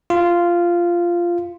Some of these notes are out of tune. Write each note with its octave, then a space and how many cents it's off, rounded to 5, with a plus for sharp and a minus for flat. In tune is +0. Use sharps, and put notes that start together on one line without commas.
F4 -10